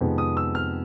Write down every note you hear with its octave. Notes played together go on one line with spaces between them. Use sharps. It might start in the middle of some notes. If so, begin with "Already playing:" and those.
F2 C3 D#3 G#3 B3
D#6
E6
F6